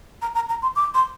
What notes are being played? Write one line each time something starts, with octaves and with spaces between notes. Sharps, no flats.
A#5
A#5
A#5
C6
D6
C6